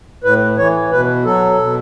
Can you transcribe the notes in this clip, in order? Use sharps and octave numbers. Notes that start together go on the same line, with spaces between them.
A2 B4
E3 C#5
B2 B4
F#3 A4
B2